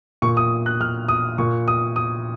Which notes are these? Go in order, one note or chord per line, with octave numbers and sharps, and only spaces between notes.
A#2 C#6
D#6
F#6
F6
D#6
A#2 C#6
D#6
D#6